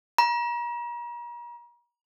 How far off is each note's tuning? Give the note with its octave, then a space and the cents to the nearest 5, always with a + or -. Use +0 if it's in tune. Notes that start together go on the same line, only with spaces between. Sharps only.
A#5 +40